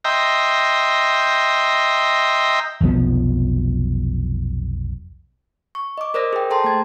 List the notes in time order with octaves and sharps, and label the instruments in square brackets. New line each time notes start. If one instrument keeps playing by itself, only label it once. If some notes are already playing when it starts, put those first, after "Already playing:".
[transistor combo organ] D#5 E5 G5 A#5 C6
[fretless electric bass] F1 B1 F3 B3
[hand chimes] C#6
D#5 D6
A#4 C5 D5 D#6 A#6
G#4 G5
A4 C5 G5 A5 A#5 C6
A3 G#6 A6